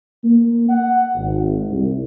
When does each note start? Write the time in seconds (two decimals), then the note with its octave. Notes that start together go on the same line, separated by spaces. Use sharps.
0.23 A#3
0.68 F#5
1.15 G#1
1.68 C2